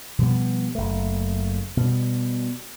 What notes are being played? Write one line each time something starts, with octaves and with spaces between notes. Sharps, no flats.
B2 F3 G3 B3
F#1 A3
B2 G3